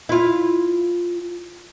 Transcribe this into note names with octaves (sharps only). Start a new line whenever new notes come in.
E4 F4